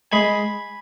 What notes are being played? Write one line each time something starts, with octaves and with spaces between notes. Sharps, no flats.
G#3 G#5 B5